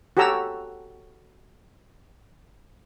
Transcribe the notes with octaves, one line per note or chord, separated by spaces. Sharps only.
F#4 G4 A4 C#5 A#5 E6